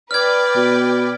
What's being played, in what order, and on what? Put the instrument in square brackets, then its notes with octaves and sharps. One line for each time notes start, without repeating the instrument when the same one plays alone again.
[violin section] B4 D5 G5 [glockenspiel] F6 G#6
[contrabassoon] B2